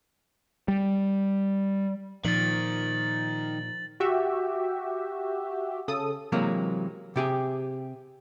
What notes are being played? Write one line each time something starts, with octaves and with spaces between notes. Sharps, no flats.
G3
A#2 D#3 F3 A6 F#7
F#4 G4 E5
C#3 A4 D#6
C3 E3 F#3 G#3 A#3
C3 G4 G#4